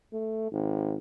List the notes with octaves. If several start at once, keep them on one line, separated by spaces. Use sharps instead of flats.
A3
G#1